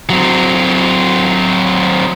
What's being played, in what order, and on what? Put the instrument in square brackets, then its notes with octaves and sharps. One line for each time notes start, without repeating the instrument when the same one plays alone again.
[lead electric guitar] F#3 C4